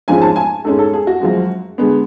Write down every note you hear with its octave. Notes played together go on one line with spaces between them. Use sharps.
G#2 F3 G#3 C#4 G#5
A5
G#5
G#2 G#3 C#4 A4
A4
G#4
F#4
F#2 F3 G#3
D3 G#3 B3